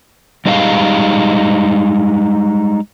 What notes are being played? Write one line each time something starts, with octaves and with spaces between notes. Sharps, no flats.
G3 G#3 D#4 G4 F5